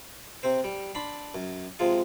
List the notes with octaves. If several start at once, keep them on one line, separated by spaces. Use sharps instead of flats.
C3 C4 C5
G3
D4 B5 C6
F#2
C3 F3 G#3 F4